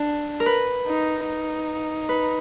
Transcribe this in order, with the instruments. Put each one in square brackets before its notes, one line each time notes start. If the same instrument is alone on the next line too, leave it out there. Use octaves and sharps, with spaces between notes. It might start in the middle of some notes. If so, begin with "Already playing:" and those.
Already playing: [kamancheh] D4
[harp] A#4
B4
[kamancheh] D#4
D#4
[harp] B4